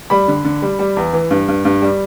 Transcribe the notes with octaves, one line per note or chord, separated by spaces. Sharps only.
G3 B5
D3
D3
G3
G3
E2
E3
G2
G2
G2
G3